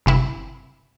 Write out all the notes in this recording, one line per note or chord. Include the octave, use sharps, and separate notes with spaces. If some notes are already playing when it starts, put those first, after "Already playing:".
G1 C3 E4